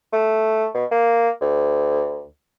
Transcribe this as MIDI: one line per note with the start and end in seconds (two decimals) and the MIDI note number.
0.13 0.66 57
0.74 0.85 47
0.91 1.29 58
1.41 2.25 38